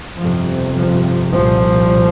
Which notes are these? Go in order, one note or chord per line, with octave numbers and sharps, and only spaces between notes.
G1 F2 C3 F3
F3
C2 A#2 F3